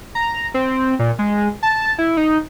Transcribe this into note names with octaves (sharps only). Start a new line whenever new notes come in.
A#5
C4
A#2
G#3
A5
E4
D#4